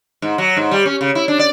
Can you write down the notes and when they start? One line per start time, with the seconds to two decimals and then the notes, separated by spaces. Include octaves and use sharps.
0.22 G#2
0.38 F#3
0.57 G#2
0.71 G3
0.86 C#4
1.01 C#3
1.15 E4
1.28 D4
1.39 D5